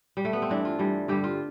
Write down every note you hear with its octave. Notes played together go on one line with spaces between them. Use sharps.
G3
A3
B3
C4
G2 E3 G3 D4
F4
G2 E3 G3
G2 D3 G3 G4
F4